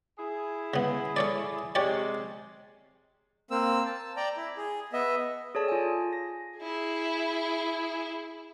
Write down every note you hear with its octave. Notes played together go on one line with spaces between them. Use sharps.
E4 G#4
C#3 B3
A4 C#5 D5
C3 G#3 G4 C#5 D5
A#3 C4 E6
A5
D5 G5 A#5
E4
G#4
B3 D#5 E5
G#4 A4 C#5 D5 A5
F4 G#5
A#6
E4 G#4